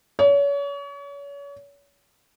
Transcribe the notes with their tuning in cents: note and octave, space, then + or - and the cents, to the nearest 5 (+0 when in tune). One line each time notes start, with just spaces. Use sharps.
C#5 +35